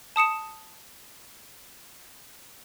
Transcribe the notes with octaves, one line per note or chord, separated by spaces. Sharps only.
A5 D#6 C#7 E7